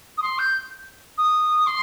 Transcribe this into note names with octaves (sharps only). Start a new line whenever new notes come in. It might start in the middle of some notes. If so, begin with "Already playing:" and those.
D#6
C6
G6
D#6
C6